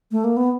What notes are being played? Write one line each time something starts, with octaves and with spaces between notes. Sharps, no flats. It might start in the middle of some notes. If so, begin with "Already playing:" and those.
A3
A#3
B3